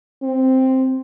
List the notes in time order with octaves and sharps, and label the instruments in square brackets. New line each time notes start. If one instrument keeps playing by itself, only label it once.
[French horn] C4